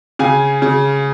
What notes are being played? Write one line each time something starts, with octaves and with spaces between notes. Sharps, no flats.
C#3 F5 G#5
C#3